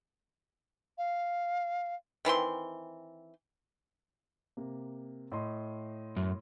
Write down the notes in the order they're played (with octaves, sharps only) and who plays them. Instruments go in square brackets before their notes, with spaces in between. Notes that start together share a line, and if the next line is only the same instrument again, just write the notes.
[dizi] F5
[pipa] D#3 E3 C4 C6
[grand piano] C3 A#3
A2 D#5 C6
[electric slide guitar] F#2